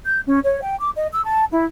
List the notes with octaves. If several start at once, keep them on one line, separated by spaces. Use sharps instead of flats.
G6
C#4
C#5
G5
D6
D#5
E6
A5
E4